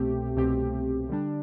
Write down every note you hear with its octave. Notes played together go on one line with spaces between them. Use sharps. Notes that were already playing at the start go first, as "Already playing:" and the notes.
Already playing: C2 B2 A3 C4 G4
C2 B2 A3 C4 G4
D3 G3 D4